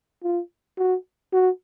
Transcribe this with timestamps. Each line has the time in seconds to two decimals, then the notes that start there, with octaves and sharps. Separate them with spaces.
0.24 F4
0.78 F#4
1.33 F#4